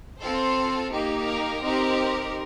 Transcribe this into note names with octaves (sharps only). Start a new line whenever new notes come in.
C4 F4 A4 C5
A#3 D#4 G4
A#4
C4 D#4 G4